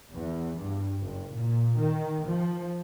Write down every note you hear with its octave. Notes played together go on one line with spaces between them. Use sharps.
E2
G2
F#1
A#2
D#3
F3